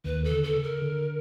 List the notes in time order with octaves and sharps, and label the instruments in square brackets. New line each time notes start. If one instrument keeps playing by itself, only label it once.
[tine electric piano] D#2 D#3 [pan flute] B4
[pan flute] A4
[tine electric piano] D3
[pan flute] A4
[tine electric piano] C#3
[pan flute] A#4
[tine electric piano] D3